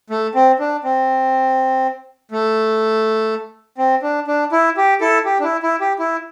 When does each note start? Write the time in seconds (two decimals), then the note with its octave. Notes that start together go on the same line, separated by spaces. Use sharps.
0.10 A3
0.35 C4
0.59 D4
0.84 C4
2.31 A3
3.78 C4
4.02 D4
4.27 D4
4.52 E4
4.77 G4
5.01 E4 A4
5.25 G4
5.40 D4
5.44 E4
5.63 E4
5.80 G4
5.99 E4